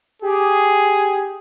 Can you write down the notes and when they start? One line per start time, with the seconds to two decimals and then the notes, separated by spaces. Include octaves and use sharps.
0.22 G4 G#4